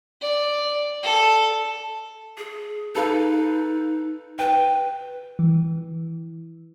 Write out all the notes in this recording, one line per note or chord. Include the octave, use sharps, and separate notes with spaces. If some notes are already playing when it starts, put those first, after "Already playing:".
D5
A4
G#4
D#4 A4 B4 F5
B4 G5
E3